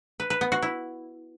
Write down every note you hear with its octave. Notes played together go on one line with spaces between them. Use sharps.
B4
B4
B3
F#4
E4